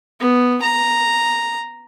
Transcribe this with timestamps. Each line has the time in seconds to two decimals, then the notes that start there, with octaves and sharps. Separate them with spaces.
0.20 B3
0.62 A#5